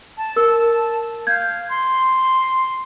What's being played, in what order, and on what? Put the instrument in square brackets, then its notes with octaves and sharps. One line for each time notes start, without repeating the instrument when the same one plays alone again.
[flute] A5
[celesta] A#4 E6
[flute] F5 [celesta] G6 G#6
[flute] C6